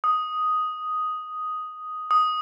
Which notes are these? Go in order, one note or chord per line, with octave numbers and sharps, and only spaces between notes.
D#6
D#6